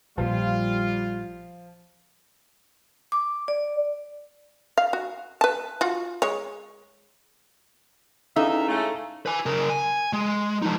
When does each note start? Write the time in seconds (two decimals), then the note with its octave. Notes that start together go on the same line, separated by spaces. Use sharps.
0.18 A#1 A#2 F3 G3 F4
3.12 D6
3.48 D5
4.78 F5
4.93 F#4
5.41 B4 A5
5.81 F4 F#4
6.22 G#3 C#5
8.36 E2 C#4 D#4 E4 A4 E5 F5
8.68 C#3 G#3 A3
9.26 B4 G#5
9.46 C#3 A#4
9.69 G#5
10.13 G#3
10.62 F3 D#4